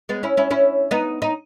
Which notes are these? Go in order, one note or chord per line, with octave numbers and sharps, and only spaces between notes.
G#3 B3
C#4 E4
C#4 E4
C#4 E4
B3 D#4
D#4